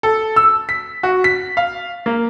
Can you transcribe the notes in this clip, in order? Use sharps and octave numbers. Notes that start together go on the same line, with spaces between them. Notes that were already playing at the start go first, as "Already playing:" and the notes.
A4
E6
B6
F#4
B6
F5
A#3